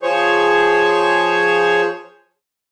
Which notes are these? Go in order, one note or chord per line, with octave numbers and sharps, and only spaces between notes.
F3 G#4 C5 C#5 C#6